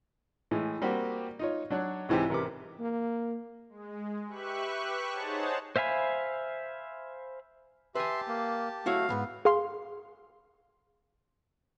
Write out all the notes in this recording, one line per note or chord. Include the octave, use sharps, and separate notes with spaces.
A2 E3 G#3
G3 A#3 C4 F#4 G4
D#4 F4 C#5
F#3 D4 C#5 F#6
C2 G#2 E3 C4 G4
A1 C3 A#4 B4 D6
A#3
G#3
G4 B4 E5 C#6 F#6
D#4 G#4 C5 C#5 F#5 A5
C5 E5 F5 G#5 B5
G4 B4 E5 G#5 A5 C6
A#3
A3 E4 F#4 C#5 F5
D#2 G#2 B3
G#4 F5 C6